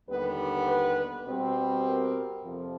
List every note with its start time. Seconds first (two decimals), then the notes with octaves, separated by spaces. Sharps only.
0.08 D#2 D3 G3 B3 B4
0.67 B4
1.26 B2 G3 C4
1.85 A#4
2.43 F2 C3 F3